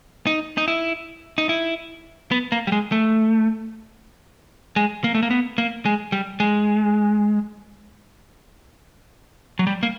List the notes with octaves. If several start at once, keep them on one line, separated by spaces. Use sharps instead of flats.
D#4
D#4
E4
D#4
E4
B3
A#3
G3
G#3
A3
G#3
A#3
A3
A#3
B3
A#3
G#3
G3
G#3
F#3
G3
A#3